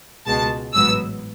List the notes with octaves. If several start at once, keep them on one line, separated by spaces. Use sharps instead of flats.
C#2 B2 G#3 A5
A1 G#2 F#3 B3 E6